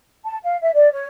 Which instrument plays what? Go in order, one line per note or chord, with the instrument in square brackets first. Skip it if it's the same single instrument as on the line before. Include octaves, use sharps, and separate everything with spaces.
[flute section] A5
F5
E5
D5
C#5